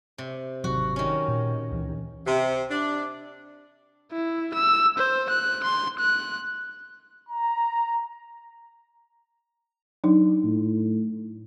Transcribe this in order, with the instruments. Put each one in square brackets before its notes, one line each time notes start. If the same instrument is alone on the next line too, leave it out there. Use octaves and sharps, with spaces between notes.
[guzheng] C3
[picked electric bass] G#1 C3 F#3 [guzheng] F#4
[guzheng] D#3 C#4
[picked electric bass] A#2
C#2 E3
[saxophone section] C3
D4
[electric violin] E4
E6
C5
F#6
C6
F#6
[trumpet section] A#5
[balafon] F#3 D4 D#4
[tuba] A2